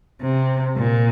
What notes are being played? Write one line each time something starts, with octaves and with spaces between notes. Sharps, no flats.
C3
A#2